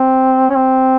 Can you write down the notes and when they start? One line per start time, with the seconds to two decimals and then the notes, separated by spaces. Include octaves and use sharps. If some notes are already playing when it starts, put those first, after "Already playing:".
Already playing: C4
0.50 C#4
0.56 C4